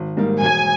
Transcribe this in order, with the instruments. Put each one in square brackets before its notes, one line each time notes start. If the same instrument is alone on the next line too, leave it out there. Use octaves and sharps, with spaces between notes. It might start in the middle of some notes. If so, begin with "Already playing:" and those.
Already playing: [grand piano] G#1
G#2 D#3 G3 A#3
[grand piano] E1 [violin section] G#5